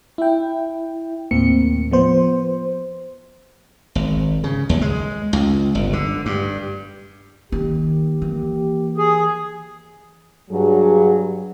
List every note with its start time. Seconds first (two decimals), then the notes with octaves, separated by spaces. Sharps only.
0.18 E4 G5
1.31 D#2 A2 A#3 C4 C#7
1.91 F3 B3 C5
3.95 G#1
4.44 C#3
4.69 D#2
4.81 G#3
5.33 C#2
5.75 G1
5.93 D3
6.26 G2
7.52 D#3 A#3 G4
8.22 E3
8.98 G#4
10.51 G2 F#3 G#4